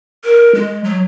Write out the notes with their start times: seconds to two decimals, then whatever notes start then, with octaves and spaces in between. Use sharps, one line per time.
0.24 A#4
0.55 G#3
0.84 F#3